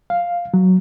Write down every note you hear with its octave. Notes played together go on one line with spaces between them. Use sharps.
F5
F#3